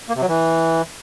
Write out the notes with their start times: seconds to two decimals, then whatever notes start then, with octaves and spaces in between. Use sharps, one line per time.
0.09 A#3
0.15 C3
0.22 F#3
0.28 E3